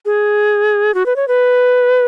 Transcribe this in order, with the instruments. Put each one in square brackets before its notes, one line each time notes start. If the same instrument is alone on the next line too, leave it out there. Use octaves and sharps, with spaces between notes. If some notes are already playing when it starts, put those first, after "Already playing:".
[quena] G#4
F#4
B4
C#5
B4